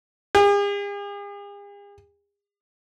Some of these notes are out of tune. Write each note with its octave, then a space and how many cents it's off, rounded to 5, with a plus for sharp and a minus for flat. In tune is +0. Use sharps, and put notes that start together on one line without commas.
G#4 -45